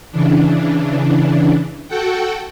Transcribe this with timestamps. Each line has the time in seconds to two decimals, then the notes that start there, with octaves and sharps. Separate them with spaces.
0.11 C#3 E3 D4
1.88 F#4 A4 F#5 G5